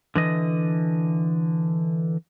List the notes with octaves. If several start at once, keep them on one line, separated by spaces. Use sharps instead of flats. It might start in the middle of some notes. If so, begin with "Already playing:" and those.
D3 E3 D#5